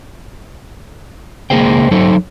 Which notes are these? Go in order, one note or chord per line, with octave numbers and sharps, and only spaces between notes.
C#2 A#3 G#4 A#4 C5 G5
F#3 D#4 A4 C5